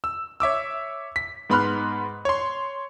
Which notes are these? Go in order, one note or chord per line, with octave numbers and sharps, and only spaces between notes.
E6
C#5 E5 D6 E6
B6
G#2 B3 B5 C6 F6 F#6
C#5 C6